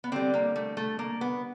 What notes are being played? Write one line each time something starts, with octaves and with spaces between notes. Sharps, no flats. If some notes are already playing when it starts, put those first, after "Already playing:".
B3
D3 G3 C4
A#3
A3
A3
A#3
B3